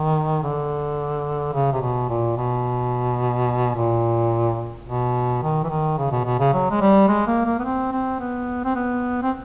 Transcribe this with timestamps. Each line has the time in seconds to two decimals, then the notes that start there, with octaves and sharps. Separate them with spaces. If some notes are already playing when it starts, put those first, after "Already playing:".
Already playing: D#3
0.43 D3
1.53 C#3
1.73 C3
1.81 B2
2.09 A#2
2.37 B2
3.75 A#2
4.86 B2
5.43 D#3
5.64 E3
5.70 D#3
5.98 C#3
6.11 B2
6.25 B2
6.40 C#3
6.53 F#3
6.71 G#3
6.81 G3
7.08 G#3
7.27 A#3
7.45 A#3
7.59 B3
7.64 C4
7.92 C4
8.20 B3
8.65 C4
8.75 B3
9.23 C4